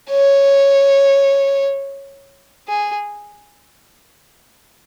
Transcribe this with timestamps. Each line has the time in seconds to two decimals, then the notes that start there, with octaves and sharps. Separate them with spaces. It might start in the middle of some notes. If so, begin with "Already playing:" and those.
0.11 C#5
2.68 G#4